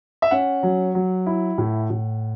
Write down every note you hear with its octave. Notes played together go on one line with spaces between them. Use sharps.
E5
C#4 F#5
F#3
F#3
E4
A2
A2